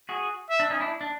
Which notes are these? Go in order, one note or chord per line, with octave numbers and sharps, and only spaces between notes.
F#4 G#4
E5
D4
C#4 D#4
D4 E4
D4